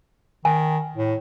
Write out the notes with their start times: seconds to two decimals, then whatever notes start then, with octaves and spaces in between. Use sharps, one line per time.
0.45 D#3 G#5
0.97 A2